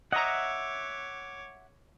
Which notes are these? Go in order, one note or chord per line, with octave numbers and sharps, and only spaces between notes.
C#5 D#5 E5 F#5 A#5 D6